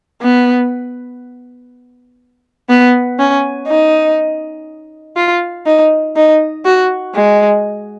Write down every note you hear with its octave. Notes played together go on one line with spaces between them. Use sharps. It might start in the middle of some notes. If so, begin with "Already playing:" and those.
B3
B3
C#4
D#4
F4
D#4
D#4
F#4
G#3